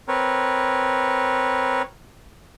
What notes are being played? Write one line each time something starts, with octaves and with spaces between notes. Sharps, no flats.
C4 A#4 B4 C#5